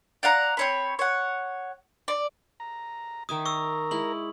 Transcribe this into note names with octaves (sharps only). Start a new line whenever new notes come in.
D5 F5 F#5 A#5
C4 C#5 B5
C#5 F#5
D5
A#5
D#3 E5 G#5 D#6
A#4 A#5 C#6 D#6 E6
G#3 E4 F#7